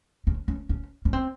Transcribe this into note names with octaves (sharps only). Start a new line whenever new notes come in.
C#4
C#4
C#4
C#4
C4